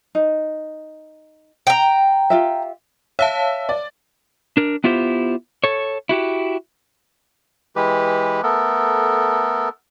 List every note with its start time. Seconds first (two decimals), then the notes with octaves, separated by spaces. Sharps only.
0.15 D#4
1.67 G5 A#5
2.30 F4 G4 E5
3.19 C#5 E5 F5 A5
3.69 D5
4.57 D4 A#4
4.84 B3 E4 F4 G4 C5
5.64 A4 C#5
6.09 E4 F#4 G4
7.76 E3 G#3 G4 B4
8.43 A3 B3 A4 A#4